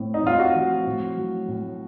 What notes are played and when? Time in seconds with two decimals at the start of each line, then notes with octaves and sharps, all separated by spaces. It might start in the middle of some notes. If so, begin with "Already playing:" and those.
Already playing: A2 C4
0.14 D#4
0.23 A2 F4
0.39 F#4
0.55 F3
0.87 A2
1.17 F#3
1.48 A2